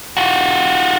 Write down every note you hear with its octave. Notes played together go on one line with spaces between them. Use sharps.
F4 F#4